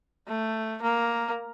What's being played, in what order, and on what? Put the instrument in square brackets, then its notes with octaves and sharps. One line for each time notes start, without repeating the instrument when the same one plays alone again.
[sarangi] A3
A#3